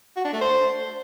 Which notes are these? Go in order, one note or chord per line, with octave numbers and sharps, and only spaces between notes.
F#4
D4
A3
C5